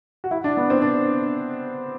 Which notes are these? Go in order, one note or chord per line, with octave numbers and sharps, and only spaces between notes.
F#4
E4
D4
B3
C4
D4